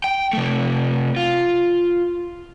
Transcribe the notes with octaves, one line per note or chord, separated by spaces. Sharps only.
G5
C3 A3
F4